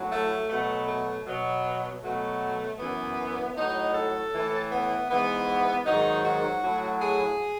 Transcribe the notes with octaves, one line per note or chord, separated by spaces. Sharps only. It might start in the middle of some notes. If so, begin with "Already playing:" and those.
Already playing: A2 F#3
A3
B2 F#3 A3
A3
B2 F#3
B2 F#3 A3
F#2 E3 B3
A2 F#3 D#4
A4
A2 E3
B3
G#2 E3 B3
G#2 D#3 F#3 D#4
F#4
A2 F#3
G#4